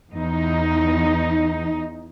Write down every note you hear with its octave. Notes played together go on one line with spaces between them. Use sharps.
E2 D#4